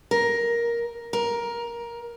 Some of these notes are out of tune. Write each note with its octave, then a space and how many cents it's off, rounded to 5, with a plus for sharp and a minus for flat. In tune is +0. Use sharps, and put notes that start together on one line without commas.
A#4 +10
A#4 +15